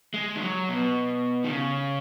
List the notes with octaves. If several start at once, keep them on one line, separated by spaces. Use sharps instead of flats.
G#3
D#3
F#3
B2
D#3
C#3